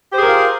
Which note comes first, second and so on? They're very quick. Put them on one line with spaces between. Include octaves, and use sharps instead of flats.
G4 C5 G#4 A#4 F4